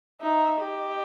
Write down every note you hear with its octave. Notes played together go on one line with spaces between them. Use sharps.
D#4 E5
G4 D#5